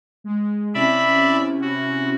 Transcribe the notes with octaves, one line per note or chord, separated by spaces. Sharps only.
G#3
C3 C#4 E4 D5 E5 B5
F#4